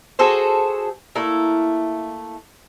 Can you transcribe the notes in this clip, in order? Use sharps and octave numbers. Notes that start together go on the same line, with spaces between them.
F#4 G#4 A4 C5
A3 A#3 E4